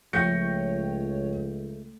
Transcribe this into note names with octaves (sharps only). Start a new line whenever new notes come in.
C#2 F3 A3 C#5 G5 G6 A#6 C#7